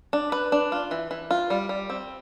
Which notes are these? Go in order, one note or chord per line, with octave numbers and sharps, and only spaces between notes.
D4
B4
D4
F4
E3
E3
F4
G3
G3
C4